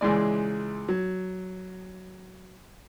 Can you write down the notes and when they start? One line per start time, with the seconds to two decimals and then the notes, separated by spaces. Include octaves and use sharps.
0.01 C#2 E3 G#3 D5
0.88 F#3